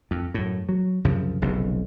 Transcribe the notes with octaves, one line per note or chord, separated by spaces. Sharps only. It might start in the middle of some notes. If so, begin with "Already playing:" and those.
F2
F#2 A2
F#3
C2 F#2 C#3 F3
F1 B1 C#3